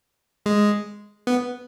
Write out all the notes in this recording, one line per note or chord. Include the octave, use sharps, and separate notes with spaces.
G#3
B3